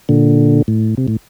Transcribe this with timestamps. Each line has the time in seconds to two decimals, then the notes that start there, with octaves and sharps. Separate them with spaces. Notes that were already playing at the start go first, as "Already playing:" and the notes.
0.09 A#2 D3
0.68 A2
0.97 C3
1.08 A2